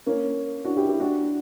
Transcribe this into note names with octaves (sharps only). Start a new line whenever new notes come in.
A#3 C#4
D4 F#4
E4 G4
E4 G4
D4 F#4